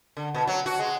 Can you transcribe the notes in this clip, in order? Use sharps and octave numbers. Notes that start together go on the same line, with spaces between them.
D3
B2
F#3
F#4
G#3